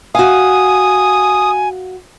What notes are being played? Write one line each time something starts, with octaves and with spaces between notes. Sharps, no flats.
F#4 F5 G#5 D#6